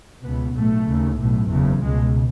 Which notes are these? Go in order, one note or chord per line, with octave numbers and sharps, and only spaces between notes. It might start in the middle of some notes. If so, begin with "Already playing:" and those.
C#2 B2 B3
B1 A2 A3
D#2 C#3
B1 A2
F#1 E2 C#3
C#2 B2 G#3